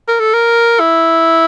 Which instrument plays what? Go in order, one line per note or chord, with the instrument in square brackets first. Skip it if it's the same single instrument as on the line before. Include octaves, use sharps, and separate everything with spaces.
[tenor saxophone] A#4
A4
A#4
E4